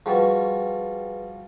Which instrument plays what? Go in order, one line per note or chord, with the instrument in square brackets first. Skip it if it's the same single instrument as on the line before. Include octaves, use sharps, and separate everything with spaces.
[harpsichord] F3 G3 F#4 [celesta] G#4 B4